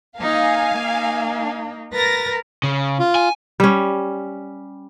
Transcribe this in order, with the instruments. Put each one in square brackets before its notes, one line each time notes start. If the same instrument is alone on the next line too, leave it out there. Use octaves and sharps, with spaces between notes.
[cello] A#3 D#4 [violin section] F5 G#5
[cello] A#3 D#4
[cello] A#4 B4 [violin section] A6 A#6
[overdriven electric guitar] C#3
[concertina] F4
[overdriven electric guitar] G#5
[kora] G3 C#4